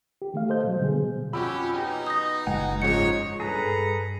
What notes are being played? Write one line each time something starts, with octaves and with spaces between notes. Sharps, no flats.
G4
D#3 A3 F5
A4 C5 D#5 G6
B2 F#3
B2 D3 G3 B3 G#4
F2 C#4 F#4 G4 B5 E6
B2 D#4 G4 G#5
D#6 G6 A#6
F#1 G#3 F#5 G#5
G#2 C#3 F3 D#4 C#5 C#7
G2 G#4 A4 B4 A#5